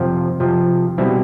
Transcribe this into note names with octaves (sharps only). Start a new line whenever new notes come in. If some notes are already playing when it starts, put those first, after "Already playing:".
Already playing: F2 C3 F3
F2 C3 F3
B2 G3 C4 E4